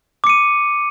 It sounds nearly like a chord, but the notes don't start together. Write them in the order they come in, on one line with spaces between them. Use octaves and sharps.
D6 C#7 D#7